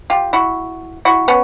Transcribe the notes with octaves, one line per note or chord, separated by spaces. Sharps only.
F4 G4
E4 F#4
E4 F#4
B3 C#4